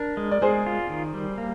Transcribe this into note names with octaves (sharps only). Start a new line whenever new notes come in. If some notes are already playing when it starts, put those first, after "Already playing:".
Already playing: D4 A#4
G#3
D5
G#3 G#4 C5
F4
D#3
G3
A#3